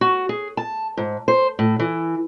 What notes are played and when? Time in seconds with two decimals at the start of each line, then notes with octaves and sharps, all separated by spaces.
0.01 F#4
0.29 G#4
0.57 A5
0.97 G#2
1.28 C5
1.59 A2
1.79 E3